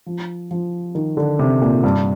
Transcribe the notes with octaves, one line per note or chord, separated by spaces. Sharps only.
F3
F3
D#3
D3
C3
A#2
G2